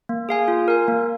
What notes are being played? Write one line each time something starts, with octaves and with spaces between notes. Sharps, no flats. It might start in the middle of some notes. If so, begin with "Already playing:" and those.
A#3
G#4 F5 G#5
F4
A#4 G#5
A#3